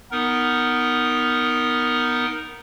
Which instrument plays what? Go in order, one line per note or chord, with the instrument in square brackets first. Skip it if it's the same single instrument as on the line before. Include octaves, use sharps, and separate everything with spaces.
[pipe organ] B3 D#4 A#4